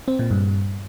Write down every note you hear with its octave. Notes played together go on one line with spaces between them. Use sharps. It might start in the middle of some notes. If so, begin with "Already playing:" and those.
C4
A#2
G2